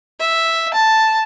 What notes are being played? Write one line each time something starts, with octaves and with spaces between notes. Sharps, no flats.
E5
A5